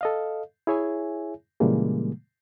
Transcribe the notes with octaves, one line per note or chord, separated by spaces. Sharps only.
A4 D#5 F5
E4 G#4 C#5 E5 G#5
A#2 C#3 E3 G3 G#3 A#3